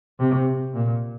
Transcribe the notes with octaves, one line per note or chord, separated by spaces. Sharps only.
C3
A#2